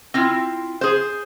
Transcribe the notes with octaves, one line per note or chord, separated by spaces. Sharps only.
C4 E4 F4
G#4 C5